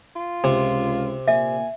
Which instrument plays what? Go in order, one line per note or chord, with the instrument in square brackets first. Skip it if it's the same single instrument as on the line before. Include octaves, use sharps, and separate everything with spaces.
[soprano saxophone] F4
[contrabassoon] C#2 [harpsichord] C3
[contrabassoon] A#2 [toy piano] E5 [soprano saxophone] G#5